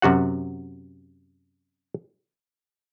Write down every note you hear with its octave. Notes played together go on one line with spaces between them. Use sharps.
F#2 C3 F#4 F#5